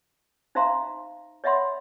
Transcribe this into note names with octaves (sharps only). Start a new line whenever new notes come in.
D#4 C5 E5 F5 A#5 C6
C#5 D#5 E5 F#5 B5 C6